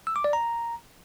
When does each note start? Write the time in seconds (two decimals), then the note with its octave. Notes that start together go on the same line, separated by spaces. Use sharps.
0.07 E6
0.16 D6
0.24 D5
0.33 A#5